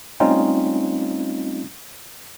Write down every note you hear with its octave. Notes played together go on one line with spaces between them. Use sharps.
G3 A3 C4 C#4 D#4 F4